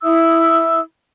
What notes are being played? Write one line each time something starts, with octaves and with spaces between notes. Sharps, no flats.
E4 E5 D#6 E6